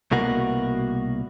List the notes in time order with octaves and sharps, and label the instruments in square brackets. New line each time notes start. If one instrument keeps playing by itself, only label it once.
[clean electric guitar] C2 B2 A#3 F#4